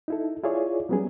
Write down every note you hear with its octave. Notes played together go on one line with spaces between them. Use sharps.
D#4 E4 A4
E4 F4 G#4 C#5 D5
F#3 G3 B3 C#4 G#4